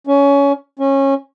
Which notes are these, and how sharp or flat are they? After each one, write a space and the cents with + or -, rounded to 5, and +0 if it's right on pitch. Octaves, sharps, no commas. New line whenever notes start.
C#4 +20
C#4 -20